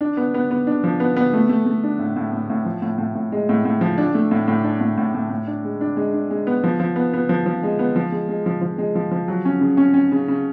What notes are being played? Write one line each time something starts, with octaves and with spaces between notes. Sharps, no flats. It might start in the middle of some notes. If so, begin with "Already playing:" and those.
D4
B3
B3
B3
D4
F3
B3
B3
A3
A3
A3
D4
A2
A2
A2
A2
F3
A2
A2
A2
G#3
A2
A2
F3
D4
A3
A2
A2
D4
A2
A2
A2
A2
D4
G#3
D4
G#3
D4
G#3
B3
F3
F3
B3
B3
F3
F3
G#3
B3
F3
G#3
G#3
F3
F3
G#3
F3
F3
F#3
C#4
C#3
C#4
C#4
C#3
C#3